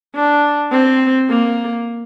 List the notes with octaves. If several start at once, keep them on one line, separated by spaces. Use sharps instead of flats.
D4
C4
A#3